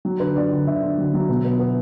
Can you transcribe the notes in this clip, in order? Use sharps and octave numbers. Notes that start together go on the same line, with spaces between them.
F#3
D3 B4
D3 D5
D3
D3 E5
D3
F#3
F#3
B2
B3
B3